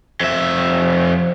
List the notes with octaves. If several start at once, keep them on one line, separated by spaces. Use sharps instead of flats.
F2 E5